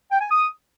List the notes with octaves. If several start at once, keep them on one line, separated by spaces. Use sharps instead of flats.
G5
G#5
D#6